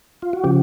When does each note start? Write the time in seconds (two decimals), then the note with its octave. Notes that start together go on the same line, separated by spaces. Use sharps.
0.22 F4
0.33 F#4
0.43 C#3 F3 G4